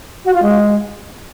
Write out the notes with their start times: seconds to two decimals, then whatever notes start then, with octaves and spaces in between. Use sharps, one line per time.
0.25 F#4
0.33 F4
0.42 G#3